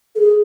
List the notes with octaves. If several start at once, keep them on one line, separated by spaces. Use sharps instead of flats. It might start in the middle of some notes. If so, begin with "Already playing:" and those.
A4
G#4